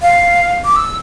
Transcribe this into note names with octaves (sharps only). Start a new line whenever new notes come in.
F5
D6
E6